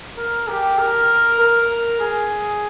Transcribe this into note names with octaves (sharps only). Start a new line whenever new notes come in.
A#4
G4
A#4
A#4
G#4